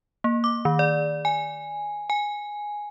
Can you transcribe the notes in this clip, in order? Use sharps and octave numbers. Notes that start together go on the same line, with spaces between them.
A#3
D6
D#3
D5
G#5
G#5